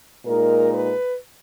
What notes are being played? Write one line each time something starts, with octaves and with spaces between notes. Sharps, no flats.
A#2 G#3 D#4 A#4
B4